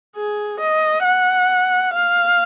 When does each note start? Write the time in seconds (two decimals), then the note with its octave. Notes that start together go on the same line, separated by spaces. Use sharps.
0.16 G#4
0.61 D#5
1.05 F#5
1.95 F5